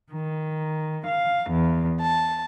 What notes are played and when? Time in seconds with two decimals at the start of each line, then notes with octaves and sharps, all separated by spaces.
0.13 D#3
1.07 F5
1.50 E2
2.02 A5